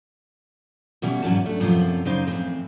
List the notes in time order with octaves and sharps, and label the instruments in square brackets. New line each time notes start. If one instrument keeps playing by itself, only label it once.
[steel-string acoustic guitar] B2 E3 G3 C#4
G#2 F#3 C#4 D5 A5
A3 D4
F#2 A2 C3 D#3 F3 C4
F#2 C#3 D#4 C5 D5
F2 A2 E3 C4